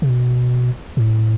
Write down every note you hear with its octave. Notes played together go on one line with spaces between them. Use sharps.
C3
B2
A2